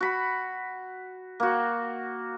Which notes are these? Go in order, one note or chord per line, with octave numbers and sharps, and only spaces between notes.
F#4 B5
A#3 F#4